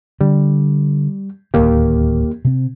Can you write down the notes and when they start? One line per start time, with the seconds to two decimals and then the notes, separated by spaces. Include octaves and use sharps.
0.21 D3 G3
1.54 D1 G1 D#2 D#3 A#3 G4
2.45 C3 C4